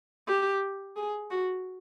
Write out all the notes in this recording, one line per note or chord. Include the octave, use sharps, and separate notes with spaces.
G4
G#4
F#4